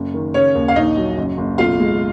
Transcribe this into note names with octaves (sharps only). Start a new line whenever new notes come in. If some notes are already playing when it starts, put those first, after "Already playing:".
Already playing: F#1
D#3
C#3 C#4 C#5
D#2
F5
A#1 D#4 D#5
F#3
F#1
F#1
B1 F4 F5
G#3